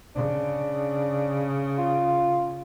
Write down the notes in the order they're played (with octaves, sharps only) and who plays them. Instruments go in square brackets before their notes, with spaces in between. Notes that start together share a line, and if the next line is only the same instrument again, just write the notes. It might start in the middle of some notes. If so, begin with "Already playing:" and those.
[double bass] C#3 [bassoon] D4
[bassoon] F4